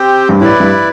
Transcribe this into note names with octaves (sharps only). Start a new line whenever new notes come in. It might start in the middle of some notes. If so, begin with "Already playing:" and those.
Already playing: C4 G4 C5
G2
A2 E4 B4 D5
G2